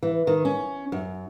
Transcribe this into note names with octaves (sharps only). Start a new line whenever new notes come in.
E3
D#3
C#4
F#2